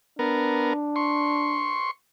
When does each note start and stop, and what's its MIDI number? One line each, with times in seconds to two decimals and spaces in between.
0.19 0.73 59
0.19 1.79 62
0.19 0.73 70
0.96 1.91 84
0.96 1.91 85